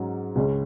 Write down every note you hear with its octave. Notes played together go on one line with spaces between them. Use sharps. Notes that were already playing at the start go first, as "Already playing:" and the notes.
Already playing: G#2 F#3 C#4
C#2 C#3 G#3 C#4